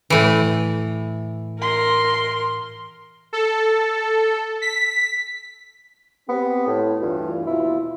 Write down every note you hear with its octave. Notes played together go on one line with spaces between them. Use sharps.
A2 E3
A#4 C6
A4
B6
B3 C4 G4
A2
D2 G2 E3 F4
D#2 B2 E4 F4